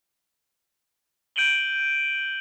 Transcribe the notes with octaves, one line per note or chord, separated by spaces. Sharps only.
G6 D7 D#7 F#7 G7